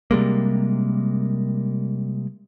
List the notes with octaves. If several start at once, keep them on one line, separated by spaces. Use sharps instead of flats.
C3 G3 G#3 A#3